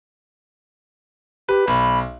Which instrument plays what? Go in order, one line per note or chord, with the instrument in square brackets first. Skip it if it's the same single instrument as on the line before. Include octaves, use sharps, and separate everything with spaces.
[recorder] G4 [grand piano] B4
[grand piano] B1 [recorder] B5